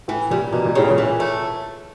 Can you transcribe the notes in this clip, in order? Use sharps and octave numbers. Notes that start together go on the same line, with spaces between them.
A2 E3
A#2 G3
B2 A#3
A#2
A2 C#3
A#2
E3
A3